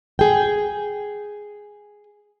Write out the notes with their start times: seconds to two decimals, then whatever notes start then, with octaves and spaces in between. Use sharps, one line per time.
0.19 G#4 G5